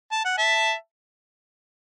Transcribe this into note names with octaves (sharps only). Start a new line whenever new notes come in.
A5
F#5
E5 A5